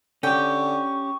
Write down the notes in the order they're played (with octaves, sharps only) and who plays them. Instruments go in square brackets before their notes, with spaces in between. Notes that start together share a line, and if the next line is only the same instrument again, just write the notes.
[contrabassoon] D3 [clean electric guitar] C#4 G4 [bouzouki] G5 [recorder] C#6